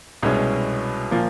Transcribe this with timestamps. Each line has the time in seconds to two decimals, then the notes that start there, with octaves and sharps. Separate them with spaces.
0.23 C2 B2 G#3 C#4
1.11 A#2 F3 A#3